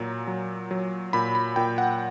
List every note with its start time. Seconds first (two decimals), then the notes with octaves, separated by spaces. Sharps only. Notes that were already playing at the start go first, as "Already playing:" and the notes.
Already playing: A#2 F#3 A#5
0.27 F#3
0.71 F#3
1.13 A#2 B5
1.35 B5
1.56 A#2 G5
1.78 F#5